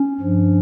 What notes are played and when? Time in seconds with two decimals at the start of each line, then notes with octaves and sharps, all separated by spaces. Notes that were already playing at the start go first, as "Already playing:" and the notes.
Already playing: C#4
0.20 G2 F3